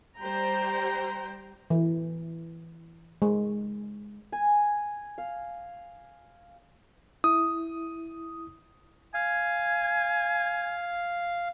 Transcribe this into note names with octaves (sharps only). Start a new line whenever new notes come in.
G3 C5 G5 A#5
E3
G#3
G#5
F5
E4 D#6
F5 G#5